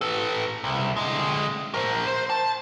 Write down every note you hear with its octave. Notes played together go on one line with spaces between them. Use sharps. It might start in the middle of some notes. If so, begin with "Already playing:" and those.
A4 B4
C2
D3 G#3
A#4 C5
C5
A5